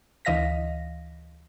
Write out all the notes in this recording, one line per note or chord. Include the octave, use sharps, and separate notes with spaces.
D2 E3 D#5 F5 A#6 B6